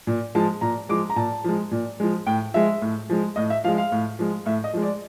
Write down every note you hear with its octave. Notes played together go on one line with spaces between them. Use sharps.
A#2
F3 G#3 A5
A#2 A#5
F3 G#3 D6
A#5
A#2 A5
F3 G#3
A#2
F3 G#3
A2 G5
F3 G#3 E5
A2
F3 G#3
A2 D#5
E5
F3 G#3 F5
F5
A2
F3 G#3
A2 E5
D#5
F3 G#3
D5